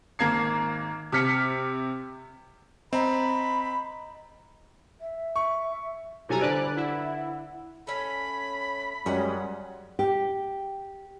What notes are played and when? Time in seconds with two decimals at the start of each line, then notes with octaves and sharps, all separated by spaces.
0.19 G#1 A#3 G#6 C7
1.12 C3 F6 B6 C#7
2.93 C4 D#5 A#5 B5
5.01 E5
5.36 C#6
6.29 C3 F#3 G3 E4 A4 G#5 A#5
6.41 D3 B4 C5 D5 F#6 D7
6.76 E4 F#5
7.87 A3 C#4 B5
9.06 F#2 G3 G#3 C#4 F#5
9.99 G4